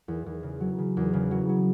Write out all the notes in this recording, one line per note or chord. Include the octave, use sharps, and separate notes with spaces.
E2
E2
C#3
F#3
C#3
E2
C#3
F#3
F#3